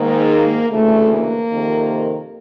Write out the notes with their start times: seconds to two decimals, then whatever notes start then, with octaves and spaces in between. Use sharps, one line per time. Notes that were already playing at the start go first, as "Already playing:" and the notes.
Already playing: G#2 D#3 A#3
0.70 D2 C#3 E3 A3
1.11 A#3
1.50 F2 C3 D#3